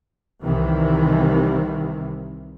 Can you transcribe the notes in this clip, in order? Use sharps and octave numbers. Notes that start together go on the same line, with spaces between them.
C2 C3 D#3 E3